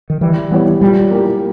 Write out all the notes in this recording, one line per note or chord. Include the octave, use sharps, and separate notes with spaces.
D#3
E3 G3
G3 B3 E4 G4 C#5
A#2 G3
A#3 E4 G4